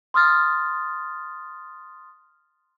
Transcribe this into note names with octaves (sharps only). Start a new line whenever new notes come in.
C6 D#6 F6 A6